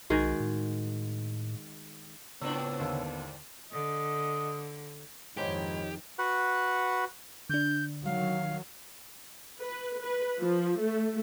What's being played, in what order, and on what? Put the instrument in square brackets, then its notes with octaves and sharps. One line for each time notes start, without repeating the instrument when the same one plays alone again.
[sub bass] B1 [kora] D#3 G#3 F#4
[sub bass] A2
[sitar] G#2 C4 D4 [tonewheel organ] C#3 C#5 E6 [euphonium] B3 [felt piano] F4
[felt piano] D#2 D3
[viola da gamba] D3 [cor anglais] D#5
[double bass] F2 D#3 [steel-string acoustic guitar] G#2 E4 [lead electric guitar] G4 [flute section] C#5 D#5
[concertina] F#4 B4 F#5
[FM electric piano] D3 D4 [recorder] G6
[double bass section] D#3 F#3 [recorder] F5
[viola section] B4
B4
F3
A3